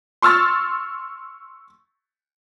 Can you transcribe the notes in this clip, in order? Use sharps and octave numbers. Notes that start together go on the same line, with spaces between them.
C6 C#6 E6 F6 A6